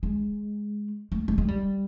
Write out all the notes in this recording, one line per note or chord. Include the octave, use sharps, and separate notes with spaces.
G#3
A3
A3
G#3
G3